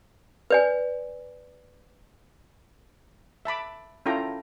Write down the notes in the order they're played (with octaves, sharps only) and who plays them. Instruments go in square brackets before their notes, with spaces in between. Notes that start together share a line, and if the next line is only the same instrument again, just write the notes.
[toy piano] B4 D5 G#5
[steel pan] E5 A5 B5 D6
C#4 E4 F4 A4 G5 A#5